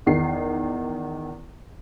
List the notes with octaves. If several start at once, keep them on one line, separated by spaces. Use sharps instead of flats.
E2 D#3 C7